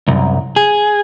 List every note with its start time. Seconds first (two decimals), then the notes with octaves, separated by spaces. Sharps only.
0.08 C2 F#2
0.56 G#4